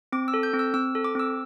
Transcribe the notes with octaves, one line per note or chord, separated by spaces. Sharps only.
C4 D6
E6
A4
G6
C4
E6
C4 E6
A4
D6
C4 E6